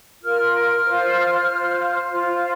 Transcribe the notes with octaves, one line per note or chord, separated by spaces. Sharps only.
F4 A#4 F6
F6
F4 C5
F4 C5
F4 C5